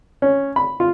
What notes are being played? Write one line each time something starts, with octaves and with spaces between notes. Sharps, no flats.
C#4
B5
F4